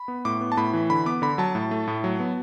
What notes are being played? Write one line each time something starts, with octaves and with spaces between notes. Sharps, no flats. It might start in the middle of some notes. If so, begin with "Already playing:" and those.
Already playing: B5
B3
A2 D6
B3
A5
A2 B5
E3
D3 B5
B3 D6
D3 B5
F#3 A5
A2
A3
A2
F#3
B3